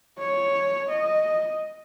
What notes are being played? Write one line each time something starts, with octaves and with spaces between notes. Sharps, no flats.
C#5
D#5